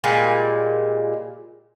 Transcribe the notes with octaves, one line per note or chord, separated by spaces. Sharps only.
A#2 G3 G#3